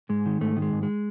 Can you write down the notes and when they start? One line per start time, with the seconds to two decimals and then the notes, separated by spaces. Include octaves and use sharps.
0.09 G#2 G#3
0.26 D#3
0.41 G#2 A3
0.57 D#3
0.62 G#3
0.73 G#2
0.83 G#3